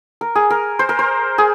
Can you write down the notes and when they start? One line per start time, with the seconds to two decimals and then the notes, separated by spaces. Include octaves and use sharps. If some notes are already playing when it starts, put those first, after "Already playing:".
0.21 A#4
0.35 G#4
0.50 A#4
0.79 C5
0.89 A#4
0.99 C5
1.38 G#4